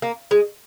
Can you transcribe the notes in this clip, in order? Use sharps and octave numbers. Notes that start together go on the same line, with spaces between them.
A#3
G#3